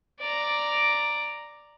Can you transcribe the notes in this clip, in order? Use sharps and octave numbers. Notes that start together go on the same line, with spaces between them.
D5 A#5